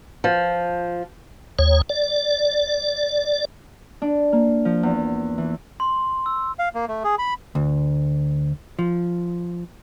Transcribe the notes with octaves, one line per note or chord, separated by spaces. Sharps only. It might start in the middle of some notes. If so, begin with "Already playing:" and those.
F3
D#2 C#5
D5
D4
A#3
F3
E2
E3
C6
E6
F5
A#3
A3
G#4
B5
D2
F3